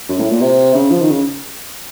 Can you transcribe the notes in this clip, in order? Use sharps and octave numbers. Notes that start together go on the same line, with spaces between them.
F#2
A2
A#2
C3
C#3
F3
D#3
C#3